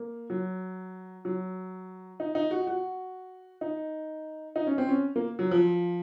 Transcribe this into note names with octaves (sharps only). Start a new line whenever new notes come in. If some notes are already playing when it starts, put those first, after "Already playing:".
Already playing: A#3
F#3
F#3
D#4
D#4
F#4
F#4
D#4
D#4
C#4
C4
C#4
A#3
F#3
F3